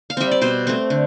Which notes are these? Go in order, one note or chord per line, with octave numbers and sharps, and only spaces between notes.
F5
G3 C4 E5
D5
B2 C5
A3 C4
D3